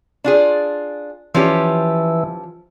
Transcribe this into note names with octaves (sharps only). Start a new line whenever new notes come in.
D4 F4 G#4
E3 F3 C#4 G4